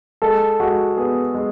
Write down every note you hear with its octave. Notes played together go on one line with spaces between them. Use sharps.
G#3 A4
G#3 F#4
B3 G#4
G#3